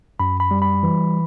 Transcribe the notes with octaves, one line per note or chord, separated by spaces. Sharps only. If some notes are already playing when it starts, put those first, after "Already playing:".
F#2 B5
B5
G3
B5
E3